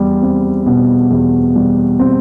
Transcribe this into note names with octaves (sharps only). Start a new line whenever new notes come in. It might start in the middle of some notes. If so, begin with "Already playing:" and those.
Already playing: E2 G3
C4
B2
E2
G3
C4